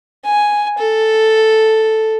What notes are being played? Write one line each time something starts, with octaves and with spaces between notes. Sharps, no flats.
G#5
A4